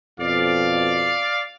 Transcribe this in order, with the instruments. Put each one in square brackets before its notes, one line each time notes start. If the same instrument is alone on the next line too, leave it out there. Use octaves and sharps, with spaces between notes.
[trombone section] F2 B2 [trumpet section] D5 F5